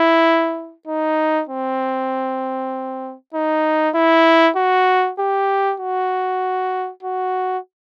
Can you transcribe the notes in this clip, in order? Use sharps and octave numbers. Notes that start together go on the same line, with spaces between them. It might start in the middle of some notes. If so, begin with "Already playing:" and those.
Already playing: E4
D#4
C4
D#4
E4
F#4
G4
F#4
F#4